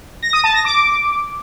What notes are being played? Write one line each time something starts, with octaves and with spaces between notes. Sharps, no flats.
A#6
D#6
A5
A#6
D6